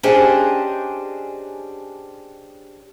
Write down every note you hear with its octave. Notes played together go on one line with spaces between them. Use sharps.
C#4 D4 G4 G#4 C5 D#5